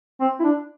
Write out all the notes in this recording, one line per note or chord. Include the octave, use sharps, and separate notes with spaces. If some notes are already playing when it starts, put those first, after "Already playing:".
C4
E4
D4